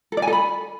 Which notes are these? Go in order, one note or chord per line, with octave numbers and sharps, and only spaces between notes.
A4
D5
G#5
A4
B5